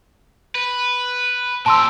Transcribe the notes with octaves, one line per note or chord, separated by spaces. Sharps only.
B4
A#2 G4 A5 C6 E6